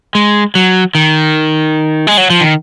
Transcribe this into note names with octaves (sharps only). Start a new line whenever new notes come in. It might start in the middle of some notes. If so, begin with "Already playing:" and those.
G#3
F#3
D#3
G#3
F#3
F3
D#3